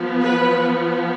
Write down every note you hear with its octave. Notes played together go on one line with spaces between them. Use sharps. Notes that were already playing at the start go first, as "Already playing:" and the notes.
Already playing: F3 B3
B4